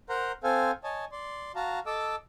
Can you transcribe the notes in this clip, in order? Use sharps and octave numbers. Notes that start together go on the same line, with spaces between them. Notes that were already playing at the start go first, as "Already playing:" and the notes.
A#4 C5 F#5 A#5 C6
C4 A4 C5 F5 G#5
C#5 D#5 G#5 A5
D5 C6
F#4 F5 A5 A#5
A4 D#5 A5 D6 E6